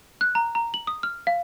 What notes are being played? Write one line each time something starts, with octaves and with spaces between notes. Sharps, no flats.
F#6
A#5
A#5
F#7
D#6
F6
F5